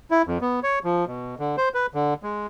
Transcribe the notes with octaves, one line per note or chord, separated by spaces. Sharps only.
E4
F2
B3
C#5
F3
B2
D3
C5
B4
D3
G#3